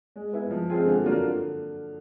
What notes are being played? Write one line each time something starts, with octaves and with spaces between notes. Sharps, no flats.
G#3
B3 E4
F3
G#3 C4 F4 G#4
D3
F#3 A#3 D4 F4
D3